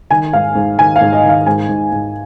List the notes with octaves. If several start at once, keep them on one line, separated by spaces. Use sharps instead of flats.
D#3 G#5
G#2 F5
G#2
D#3 G#5
F5
G#2
D#5
D#3
F5
G#2 G#5
G#2
G#2